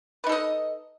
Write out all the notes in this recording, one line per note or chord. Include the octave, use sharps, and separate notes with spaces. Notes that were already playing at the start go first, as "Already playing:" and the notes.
D#4 A4 B4 D#5